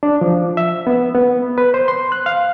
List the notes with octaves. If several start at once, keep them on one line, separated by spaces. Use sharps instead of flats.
D4
F3
E5
B3
B3
B4
C5
C6
F#6
F5